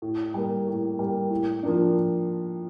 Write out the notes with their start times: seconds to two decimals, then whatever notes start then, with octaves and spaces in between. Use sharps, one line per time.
0.02 A2
0.34 G3 A#3
0.67 A2
0.99 G3 A#3
1.30 A2
1.63 F3 A#3 D4